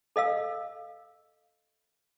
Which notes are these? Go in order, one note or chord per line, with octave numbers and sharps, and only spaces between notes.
A4 D#5 F5 E6